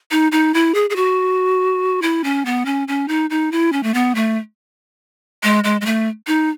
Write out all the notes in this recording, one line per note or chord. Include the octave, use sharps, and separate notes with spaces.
D#4
D#4
E4
G#4
G#4
F#4
E4
C#4
B3
C#4
C#4
D#4
D#4
E4
C#4
A3
B3
A3
G#3
G#3
G#3
A3
D#4